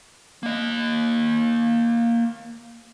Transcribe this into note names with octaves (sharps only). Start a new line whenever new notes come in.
A#3 D#5